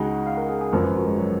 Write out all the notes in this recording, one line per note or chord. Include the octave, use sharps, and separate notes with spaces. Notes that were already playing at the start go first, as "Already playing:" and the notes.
Already playing: C#2 C#3 G#3 D#4 F#4 F#5
F5
A#4
G#4
G#4
G#1 F#2 F3 A#4
B4
F#4
G#3
F#3